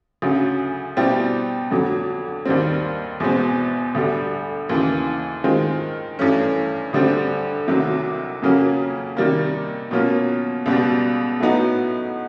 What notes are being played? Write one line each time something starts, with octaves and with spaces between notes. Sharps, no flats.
D2 C#3 F#3
B2 G3 C4 E4 G4
F2 D3 F#3
D#2 D#3 G3 C4
E2 B2 G#3 C4
D2 D3 G3
D#2 C#3 E3
D#3 G#3 C4 F4
G2 E3 A3 C#4
D2 D3 G3 C4
C2 C3 D#3 F#3
F2 C#3 F#3 A#3 C#4
C3 D#3 G3 A#3
B2 F#3 A#3 C#4 F4
C#2 B2 G3
A2 F#3 B3 D#4 F#4